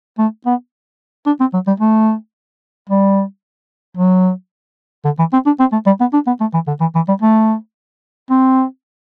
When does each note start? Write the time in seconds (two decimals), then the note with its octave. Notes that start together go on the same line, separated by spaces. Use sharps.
0.18 A3
0.46 B3
1.26 D4
1.40 C4
1.54 F#3
1.67 G3
1.80 A3
2.89 G3
3.97 F#3
5.05 D3
5.19 E3
5.33 C4
5.46 D4
5.60 C4
5.72 A3
5.86 G3
6.00 B3
6.13 D4
6.27 B3
6.40 A3
6.54 E3
6.67 D3
6.80 E3
6.95 E3
7.08 G3
7.22 A3
8.30 C4